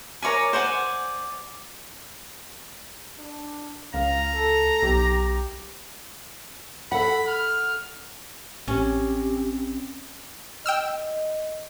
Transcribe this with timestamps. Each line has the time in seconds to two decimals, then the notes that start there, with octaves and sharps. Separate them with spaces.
0.22 A#4 C#5 D5 G#5
0.53 C5 D5 F#5 G#5
3.18 D4
3.94 C#2 F5 A#5
4.35 A4
4.82 B1 G4
6.92 A4 F#5 B5
7.27 F6
8.68 A1 C4 C#4 G4
10.66 D#5 G5 E6 F6